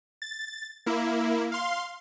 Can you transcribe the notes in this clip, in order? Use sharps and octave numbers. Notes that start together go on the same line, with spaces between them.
A6
A#3 E4
F5 C6